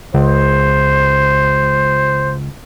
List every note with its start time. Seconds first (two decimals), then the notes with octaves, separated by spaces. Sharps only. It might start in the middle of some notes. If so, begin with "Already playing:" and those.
0.14 C#2 C5